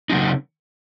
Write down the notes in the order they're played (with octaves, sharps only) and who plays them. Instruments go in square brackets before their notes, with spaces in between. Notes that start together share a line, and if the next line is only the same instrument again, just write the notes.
[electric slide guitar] C#3 F#3 C4 D#4